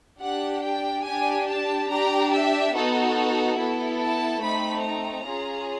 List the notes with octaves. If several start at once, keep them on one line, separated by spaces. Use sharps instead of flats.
D4 G4 F#5
G5
G4 G#5
D4
A5
D4 G4 A#5
E5
B3 D#4 F#4 A4
B3 E4 A4
A5
A3 C4 D#4 B5
A#5
C#4 F4 G#4